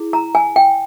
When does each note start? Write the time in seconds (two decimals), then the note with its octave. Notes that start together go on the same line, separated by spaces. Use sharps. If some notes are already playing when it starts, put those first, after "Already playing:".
Already playing: E4 G#4
0.13 A#5
0.35 G#5
0.56 G5